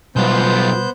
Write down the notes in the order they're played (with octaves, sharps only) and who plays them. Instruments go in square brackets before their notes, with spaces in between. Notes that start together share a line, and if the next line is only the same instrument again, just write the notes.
[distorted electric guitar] B1 F4 [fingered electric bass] B2 G3 [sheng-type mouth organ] B3 C5 G6